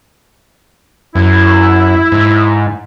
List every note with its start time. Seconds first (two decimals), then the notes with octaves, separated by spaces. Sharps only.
1.15 F#2 E4
2.12 G#2